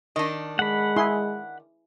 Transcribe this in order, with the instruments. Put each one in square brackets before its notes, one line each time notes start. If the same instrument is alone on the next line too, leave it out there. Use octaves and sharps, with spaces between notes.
[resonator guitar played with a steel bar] D#3 D4 [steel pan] D#5
[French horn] G#3 [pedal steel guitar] F#5 B5
[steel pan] E4 G#4 C6